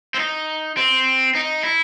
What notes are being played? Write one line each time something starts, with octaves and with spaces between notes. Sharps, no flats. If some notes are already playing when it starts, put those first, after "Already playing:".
C4
D#4
C4
D#4
E4